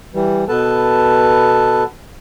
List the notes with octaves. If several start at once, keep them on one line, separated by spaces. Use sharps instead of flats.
E3 G3
B2 B3 A4 B4 A5